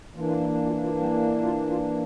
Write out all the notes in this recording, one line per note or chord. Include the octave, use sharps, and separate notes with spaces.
E3 A#3 D4 F4
F4
E4
E4
F4
F4
G3 G4
F4
F4